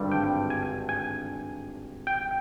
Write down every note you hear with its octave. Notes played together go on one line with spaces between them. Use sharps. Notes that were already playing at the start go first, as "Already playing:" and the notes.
Already playing: G#1 G2 D3 G3
G5
G#5
G#5
G5